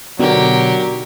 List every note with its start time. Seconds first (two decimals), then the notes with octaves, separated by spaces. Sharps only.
0.19 B2 D3 F#3 D#4 F#4 G4 A#4 D5